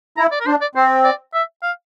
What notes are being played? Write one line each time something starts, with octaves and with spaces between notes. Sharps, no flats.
E4 A#5
D5
A#4
D4 C5
D5
C4 C5
D5
E5
F5